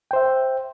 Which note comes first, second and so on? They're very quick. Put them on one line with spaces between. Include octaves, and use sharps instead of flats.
G5 C5 E5